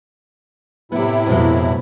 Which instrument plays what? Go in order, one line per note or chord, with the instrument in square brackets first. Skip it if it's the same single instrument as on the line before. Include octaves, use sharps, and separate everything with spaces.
[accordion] A2 C3 E4 [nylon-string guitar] B3 G4
[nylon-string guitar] F2 G#3 [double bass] B2